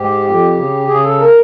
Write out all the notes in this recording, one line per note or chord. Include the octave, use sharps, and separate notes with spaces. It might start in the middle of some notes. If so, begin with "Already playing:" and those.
Already playing: G#2 G4
F2
C#3
C#3 G#4
A4
A#4